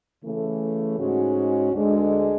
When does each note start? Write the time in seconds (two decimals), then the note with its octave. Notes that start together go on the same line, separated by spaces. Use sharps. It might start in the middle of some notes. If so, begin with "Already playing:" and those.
0.24 C#3 E3 A3
0.98 G#2 G#3 C#4 F#4
1.74 D2 D3 G#3 D4